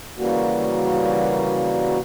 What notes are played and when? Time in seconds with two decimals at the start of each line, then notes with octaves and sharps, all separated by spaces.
0.18 C#3 E3 G3 A#3 F#4